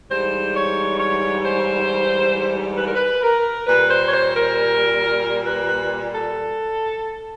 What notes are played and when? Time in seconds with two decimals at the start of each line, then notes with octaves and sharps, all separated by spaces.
0.09 G#2 E3 G3 C5
0.54 C#5
0.98 C#5
1.43 C5
2.77 B4
2.85 A#4
2.94 B4
3.22 A#4
3.67 A#2 G3 B4
3.89 C5
4.07 C#5
4.11 C5
4.34 A#4
5.45 B4
5.68 B4
6.12 A4